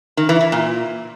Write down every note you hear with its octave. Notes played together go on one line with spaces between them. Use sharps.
D#3
E3
E3
A#2